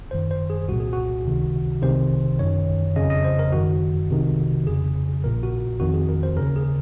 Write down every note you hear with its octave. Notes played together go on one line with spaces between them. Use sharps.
G#1 F#2 D#3 C5
C5
G#4
C2 A#2 F#4
G#4
F#4
C#2 C3 D#3
C2 C3 D#3 C5
G#1 F#2 D#3 C#5
F2 C#3 D#5
D#5
C5
A#4
G#1 F#2 D#3 F#4
C2 C3 D#3
F2 C#3 G#4
A#1 A#2 A#4
F#4
F2 D#3 F#4
G#4
A#4
C5
D#2 C#3 A#4
G#4